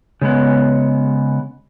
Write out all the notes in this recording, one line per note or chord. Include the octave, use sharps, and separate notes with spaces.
C#3 G#3 B3